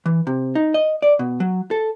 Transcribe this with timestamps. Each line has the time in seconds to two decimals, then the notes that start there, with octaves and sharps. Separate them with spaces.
0.06 E3
0.27 C3
0.55 D#4
0.74 D#5
1.02 D5
1.19 B2
1.40 F#3
1.71 A4